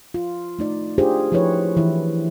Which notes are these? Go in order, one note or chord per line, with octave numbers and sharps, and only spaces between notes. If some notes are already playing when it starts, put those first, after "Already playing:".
F4
A3 D#4 D5
D4 F4 G4 G#4 C5
F3 E4 G#4 B4 C#5
E3 E4